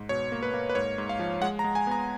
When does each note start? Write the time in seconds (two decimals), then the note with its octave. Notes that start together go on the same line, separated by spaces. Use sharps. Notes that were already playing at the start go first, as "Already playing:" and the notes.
Already playing: G#2
0.09 B2 C#5
0.32 A#3
0.43 B4
0.54 A#3
0.69 B4
0.75 G#2 C#5
0.98 G#2
1.09 F5
1.19 F3
1.42 G#3 F#5
1.59 A#5
1.64 G#3
1.75 G#5
1.87 B3 A#5